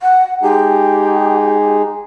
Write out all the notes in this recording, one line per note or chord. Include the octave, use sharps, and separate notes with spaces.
F#5
G#3 D#4 G4 G#4